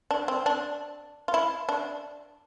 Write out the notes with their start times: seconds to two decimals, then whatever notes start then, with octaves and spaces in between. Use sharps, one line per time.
0.11 D4
0.28 C4
0.46 D4
1.28 F4
1.34 E4
1.69 D4